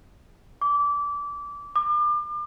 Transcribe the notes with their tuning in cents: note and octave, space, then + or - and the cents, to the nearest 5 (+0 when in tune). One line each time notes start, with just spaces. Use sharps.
D6 -20
D6 +35